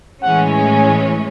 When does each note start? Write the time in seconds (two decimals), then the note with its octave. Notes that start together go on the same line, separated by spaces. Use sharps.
0.23 A2 E3 G#3 C#4 F#5
0.53 G#5